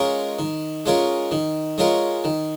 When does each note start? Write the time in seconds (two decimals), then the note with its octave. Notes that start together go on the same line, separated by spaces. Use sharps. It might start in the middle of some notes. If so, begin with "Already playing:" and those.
Already playing: G#3 C#4 F4 A#4
0.39 D#3
0.86 G#3 C#4 F4 A#4
1.31 D#3
1.78 G#3 C#4 F4 A#4
2.24 D#3